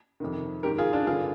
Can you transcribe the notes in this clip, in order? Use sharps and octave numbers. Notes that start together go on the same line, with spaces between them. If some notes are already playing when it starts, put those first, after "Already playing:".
F2 C3 D#3
G#2 D#3 G4 A#4
F4 G#4
D4 F4
G2 D3 F4 G#4